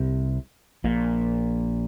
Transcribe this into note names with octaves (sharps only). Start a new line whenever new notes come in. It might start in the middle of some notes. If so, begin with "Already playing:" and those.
Already playing: C2 C3
A#1 A#2